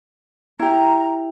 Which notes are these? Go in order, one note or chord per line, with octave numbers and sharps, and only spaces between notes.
E4 G4 A#5